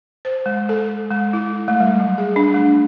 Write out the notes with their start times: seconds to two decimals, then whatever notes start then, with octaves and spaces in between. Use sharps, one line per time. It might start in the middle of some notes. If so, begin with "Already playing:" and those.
0.25 C5
0.46 G#3
0.69 A4
1.11 G#3
1.33 E4
1.68 A3
1.80 G3
2.00 F#3
2.18 G#4
2.36 D4
2.54 A3